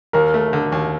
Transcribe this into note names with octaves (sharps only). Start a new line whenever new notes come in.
D#2 A#4
A3
D3
D#2